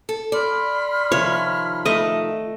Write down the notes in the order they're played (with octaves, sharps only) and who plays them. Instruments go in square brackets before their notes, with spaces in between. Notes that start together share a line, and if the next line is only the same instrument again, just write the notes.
[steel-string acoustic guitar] A4
[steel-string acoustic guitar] D5 [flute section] B5 C6 F6
[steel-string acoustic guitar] C3 D#3 F3 [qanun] C#5
[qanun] A3 D#5